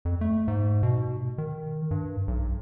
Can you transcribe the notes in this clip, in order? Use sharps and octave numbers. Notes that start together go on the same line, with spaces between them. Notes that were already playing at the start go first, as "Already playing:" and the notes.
F2
A3
G#2
B2
D#3
G2
B1